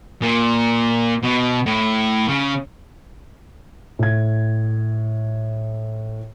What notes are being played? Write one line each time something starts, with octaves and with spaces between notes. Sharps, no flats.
A#2
B2
A2
C#3
A2 G#6